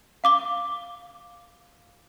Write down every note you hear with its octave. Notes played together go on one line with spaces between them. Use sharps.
F5 D6 G7